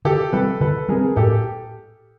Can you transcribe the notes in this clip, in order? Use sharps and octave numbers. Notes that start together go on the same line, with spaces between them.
D3 G4 A4
G3 C4 A4 B4
D3 A4 B4
G3 C4 G#4 A#4
A2 G4 A4